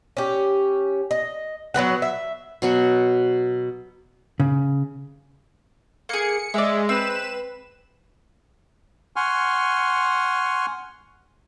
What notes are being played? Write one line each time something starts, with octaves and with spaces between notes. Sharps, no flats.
C#4 G4
D#5
F#3 G#3 B3 F#5
E5
B2 F#3 F#4
C#3
A#3 G#4 C#7
G#3 D5 E5
C4 B4 E7
F#5 G#5 C6 C#6 F6